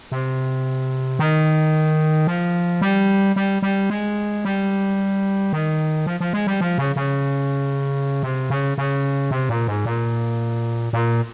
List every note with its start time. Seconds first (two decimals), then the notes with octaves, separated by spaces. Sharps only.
0.12 C3
1.19 D#3
2.27 F3
2.81 G3
3.36 G3
3.62 G3
3.90 G#3
4.45 G3
5.53 D#3
6.06 F3
6.20 F3
6.33 G#3
6.47 G3
6.61 F3
6.78 C#3
6.96 C#3
8.23 C3
8.50 C#3
8.78 C#3
9.31 C3
9.49 A#2
9.67 G#2
9.85 A#2
10.93 A#2